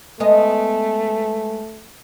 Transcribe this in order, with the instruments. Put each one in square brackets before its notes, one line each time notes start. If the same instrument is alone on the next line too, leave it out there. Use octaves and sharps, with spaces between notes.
[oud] G#3 B3 D#5 [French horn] A3